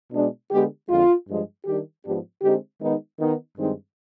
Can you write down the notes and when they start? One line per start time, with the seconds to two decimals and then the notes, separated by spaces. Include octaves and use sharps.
0.12 B2 G#3 D4
0.50 D3 G#3 B3 G4
0.88 F2 D3 G#3 F4
1.27 G2 F3 G#3
1.65 D#3 G3 D4 G4
2.04 G#2 F3 B3 D4 G4
2.41 D3 G#3 C4 D#4 G4
2.80 D#3 G#3 B3 D#4
3.18 D#3 B3 D#4
3.57 G2 D#3 G#3 C4 D#4